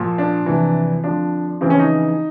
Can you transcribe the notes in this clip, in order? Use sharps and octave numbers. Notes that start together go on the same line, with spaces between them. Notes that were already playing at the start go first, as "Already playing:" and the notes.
Already playing: A#2 F3
D4
F2 C3 E3
F2 D3 F3 D4
F2 C#3 E3 C4
C#4
D#4